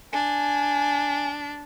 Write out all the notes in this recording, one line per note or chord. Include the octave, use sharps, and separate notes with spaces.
D4 G#5